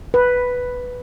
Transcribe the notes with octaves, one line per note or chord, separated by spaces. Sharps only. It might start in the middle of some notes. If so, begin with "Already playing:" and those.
B4